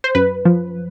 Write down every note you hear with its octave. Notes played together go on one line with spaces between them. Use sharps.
C5
F#2 B4
F3